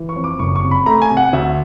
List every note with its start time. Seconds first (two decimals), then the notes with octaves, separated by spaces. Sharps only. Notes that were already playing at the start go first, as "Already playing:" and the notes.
Already playing: E3
0.09 C#6
0.16 F2
0.24 D6
0.39 F#1 C#6
0.56 C#6
0.63 C3
0.71 B5
0.86 A3 A#5
1.02 G#5
1.10 C3
1.17 F#5
1.33 D2 E5